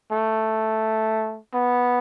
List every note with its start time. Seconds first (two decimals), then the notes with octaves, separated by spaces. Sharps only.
0.11 A3
1.54 B3